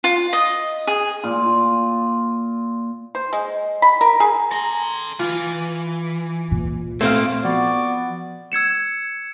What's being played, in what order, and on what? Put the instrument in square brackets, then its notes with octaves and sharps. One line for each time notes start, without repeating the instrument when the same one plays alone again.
[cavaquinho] F4
D#5
G#4
[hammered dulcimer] A#2 F4
[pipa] C5
G#3
B5
A#4
G#4
[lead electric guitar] A4 C6 [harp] A#5
[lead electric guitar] E3 [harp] F4
[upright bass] A#2
[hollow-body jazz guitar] A3 C4 [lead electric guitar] A#3 [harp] C5 F5
[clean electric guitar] F3 [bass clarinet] B3 [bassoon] F#4 [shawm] D5
[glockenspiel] E6 G#6 C#7 E7